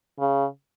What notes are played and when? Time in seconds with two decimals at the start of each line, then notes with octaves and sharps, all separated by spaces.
0.19 C#3